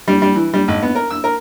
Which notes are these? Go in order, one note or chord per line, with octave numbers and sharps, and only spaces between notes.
G3
G3
E3
G3
G#1
B3
A#4
E6
A#4